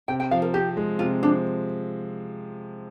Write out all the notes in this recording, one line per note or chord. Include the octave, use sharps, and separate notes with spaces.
C3 G5
G5
F3 F5
A#4
C4 G4
G#3
C3 F4
F3 D4